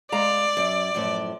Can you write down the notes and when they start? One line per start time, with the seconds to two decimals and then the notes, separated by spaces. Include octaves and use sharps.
0.12 G#3 D5 F5 A#5
0.57 F#2
0.95 F#2 A2 F3